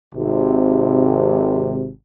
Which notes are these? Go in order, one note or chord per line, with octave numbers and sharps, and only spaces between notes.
G#1 C3